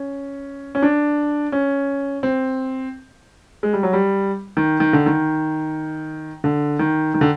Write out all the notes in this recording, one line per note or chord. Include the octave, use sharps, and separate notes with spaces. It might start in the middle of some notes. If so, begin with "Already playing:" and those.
Already playing: C#4
C#4
D4
C#4
C4
G#3
G3
F#3
G3
D#3
D#3
D3
D#3
D3
D#3
D#3
D3